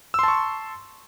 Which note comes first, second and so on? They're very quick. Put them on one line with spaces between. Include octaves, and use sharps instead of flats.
E6 C6 A5 C#6